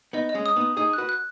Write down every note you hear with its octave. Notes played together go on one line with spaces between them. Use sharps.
B3 D#4 D#5
D#5
G#3 C#4
D#6
B3 D#4
D#6
D#4 G#4 D#6
F#4 B4 F#6
F#6